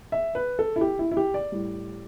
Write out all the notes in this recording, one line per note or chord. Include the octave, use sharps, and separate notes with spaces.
E5
B4
A4
E4
G4
E4
E4
G4
D5
A2 G3